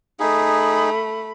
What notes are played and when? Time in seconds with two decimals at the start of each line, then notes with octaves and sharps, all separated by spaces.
0.20 A3 D#4 G#4 B5